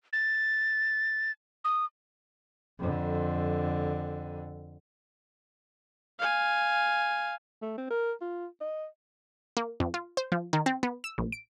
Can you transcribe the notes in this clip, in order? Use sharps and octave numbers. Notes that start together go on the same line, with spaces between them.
A6
D#6
F2 D3
F5 G#5
A3
C4
A#4
F4
D#5
A#3
F2
F4
C5
F3
D#3
C4
B3
E6
A#1
D7